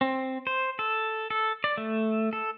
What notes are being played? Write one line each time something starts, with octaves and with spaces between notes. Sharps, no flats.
C4
C5
A4
A4
D5
A3
A4